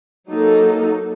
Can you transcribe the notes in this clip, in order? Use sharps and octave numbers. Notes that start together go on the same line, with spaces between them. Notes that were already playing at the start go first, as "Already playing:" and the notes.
F#3 A#3 D#4 A4